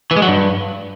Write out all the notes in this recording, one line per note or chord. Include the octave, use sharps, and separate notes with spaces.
E3
G#3
F#3
G2